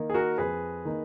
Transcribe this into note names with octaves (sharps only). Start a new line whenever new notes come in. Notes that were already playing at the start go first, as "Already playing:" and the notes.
Already playing: D#3 A#3 D#4
G#4
F#4 A#4
F2 G#4 B4
D#3 A#3 D#4